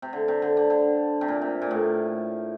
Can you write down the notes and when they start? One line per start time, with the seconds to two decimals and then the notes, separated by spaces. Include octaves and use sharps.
0.02 C3
0.13 D3
0.28 C3
0.42 D3
0.57 D3
0.70 D3
1.21 C3
1.28 A#2
1.42 C3
1.62 A#2
1.71 A2